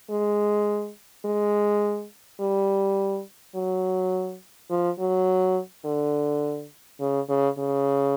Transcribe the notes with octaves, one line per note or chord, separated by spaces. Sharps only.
G#3
G#3
G3
F#3
F3
F#3
D3
C#3
C#3
C#3